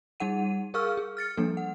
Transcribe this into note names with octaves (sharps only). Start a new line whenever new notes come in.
G3 D#4 G#4 F#5 D#7
G#4 A#4 F5 C#6 E6 F6
G#4
F6 A6 C#7
F3 G3 A#3 D4 A4
F#5